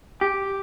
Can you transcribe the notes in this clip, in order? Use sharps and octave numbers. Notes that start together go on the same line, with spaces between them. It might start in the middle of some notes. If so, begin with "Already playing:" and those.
G4